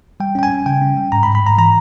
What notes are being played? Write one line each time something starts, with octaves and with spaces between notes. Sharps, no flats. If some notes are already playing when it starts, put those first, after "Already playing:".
G3 G5
C#4 G5
G#5
G3
C#3 G5
C#4
G3
G#2 A#5
B5
G#2
B5
G#2 A#5
E3 A#5